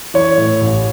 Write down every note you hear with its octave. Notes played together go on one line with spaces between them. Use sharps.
E3 C#5
A2
A1